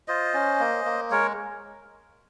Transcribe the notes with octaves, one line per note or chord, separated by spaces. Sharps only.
F4 C5 D#5
C#4
A#3
A#3
G#3 A#4 C#5